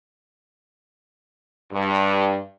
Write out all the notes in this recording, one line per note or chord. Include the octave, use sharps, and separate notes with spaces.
G2